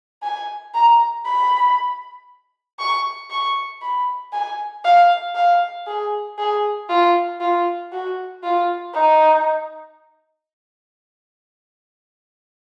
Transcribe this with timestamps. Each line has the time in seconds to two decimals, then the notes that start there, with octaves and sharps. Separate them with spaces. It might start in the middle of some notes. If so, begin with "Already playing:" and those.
0.23 G#5
0.74 A#5
1.25 B5
2.79 C#6
3.31 C#6
3.82 B5
4.33 G#5
4.84 F5
5.35 F5
5.87 G#4
6.39 G#4
6.89 F4
7.41 F4
7.92 F#4
8.43 F4
8.94 D#4